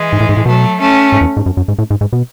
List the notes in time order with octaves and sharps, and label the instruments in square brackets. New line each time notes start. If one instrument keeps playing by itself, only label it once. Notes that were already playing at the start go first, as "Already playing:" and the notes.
Already playing: [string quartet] E3 G#3
[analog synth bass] G#2
A2
G#2
A2
[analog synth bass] B2 [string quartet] F#3 A3
[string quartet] A3 C#4
[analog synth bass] G#2
E2
G#2
F#2
F#2
G#2
A2
G#2
G#2
B2